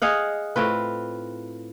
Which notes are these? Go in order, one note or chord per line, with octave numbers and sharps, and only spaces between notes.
G#4 D#5 F5 F#5
A2 C4 F4 B4